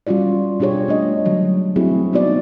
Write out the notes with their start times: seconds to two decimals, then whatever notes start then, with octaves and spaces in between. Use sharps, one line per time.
0.07 G3 C#4 F4 F#4 D5
0.60 B2 D4 F4 G4 G#4 C#5
0.88 A3 D4 D#5
1.25 D3 F#3 G3
1.76 A3 C4 E4 F#4 G#4
2.13 B3 D#4 F#4 D5